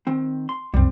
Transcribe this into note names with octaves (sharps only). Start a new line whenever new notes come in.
D#3 C4
C6
C2 F#2 G3 C4